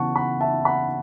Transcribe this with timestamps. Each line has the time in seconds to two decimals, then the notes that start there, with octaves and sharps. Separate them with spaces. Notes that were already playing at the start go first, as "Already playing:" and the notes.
Already playing: C#3 E3 B3 E4 F#5 A5 C#6
0.16 F#5 B5
0.41 E5 A5
0.65 F#5 B5